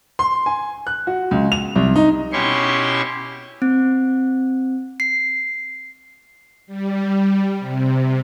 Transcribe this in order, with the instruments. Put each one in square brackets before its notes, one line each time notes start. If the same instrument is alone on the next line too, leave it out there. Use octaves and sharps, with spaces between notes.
[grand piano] C6
G#5
F#6
F#4
C#2
F7
C2
D#4
[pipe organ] B2 C#4 E4 G4 C6 C#6
[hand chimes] C4
C7
[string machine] G3
C3